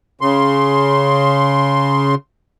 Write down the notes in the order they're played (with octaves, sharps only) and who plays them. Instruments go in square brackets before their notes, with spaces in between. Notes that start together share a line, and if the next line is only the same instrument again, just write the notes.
[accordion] C#3 C6